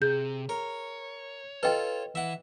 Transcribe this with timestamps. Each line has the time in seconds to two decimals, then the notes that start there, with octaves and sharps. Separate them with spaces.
0.02 C3 G#4 G6
0.49 A#4 C#5
1.63 F4 A4 B4 D#5 G5
2.15 E3 E5 F#5